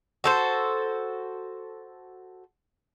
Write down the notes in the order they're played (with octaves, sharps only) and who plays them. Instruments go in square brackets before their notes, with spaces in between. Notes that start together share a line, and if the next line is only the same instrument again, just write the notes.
[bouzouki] F#4 A4 C5